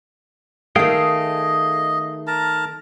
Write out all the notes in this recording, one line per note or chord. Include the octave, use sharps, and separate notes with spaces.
D#3 A3 G#4 D#5 F5 G5
A#4 A5 A#5